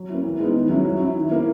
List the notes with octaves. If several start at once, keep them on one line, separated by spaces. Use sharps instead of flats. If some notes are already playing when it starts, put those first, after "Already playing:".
Already playing: F#3
A#3 C#4 E4
E3
G#3 B3 D#4
D#3
F#3 C#4 E4
F#3
C#4 E4
D#3
A#3 E4